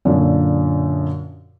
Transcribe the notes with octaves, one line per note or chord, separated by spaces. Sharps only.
F#2 A#2 D3